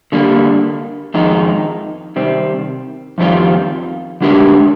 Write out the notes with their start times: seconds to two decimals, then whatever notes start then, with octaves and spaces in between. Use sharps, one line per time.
0.12 D3 G3 A#3
1.14 F2 D#3 G#3 D#4
2.16 C3 D#3 G3 C4
3.18 F2 D#3 G3 C4 F4
4.21 D3 G#3 D4 G4 A#4